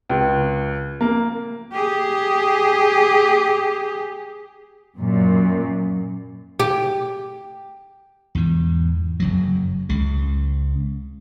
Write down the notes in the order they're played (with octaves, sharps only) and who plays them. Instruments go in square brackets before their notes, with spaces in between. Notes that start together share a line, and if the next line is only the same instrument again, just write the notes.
[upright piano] C#2
A#3
[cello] G4 G#4
[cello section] F#2 A#2
[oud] G4
[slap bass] E2 G#2
F#1 F#2 F#3
C#2 C#3